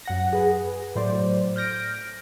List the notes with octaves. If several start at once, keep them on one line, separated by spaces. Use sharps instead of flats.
F#2 F#5 A#6
G#4 B4
A2 F#3 C5 D5
F6 G6 A#6 D7